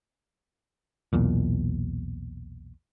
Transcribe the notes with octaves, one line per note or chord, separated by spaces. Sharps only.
B1 E2 A#2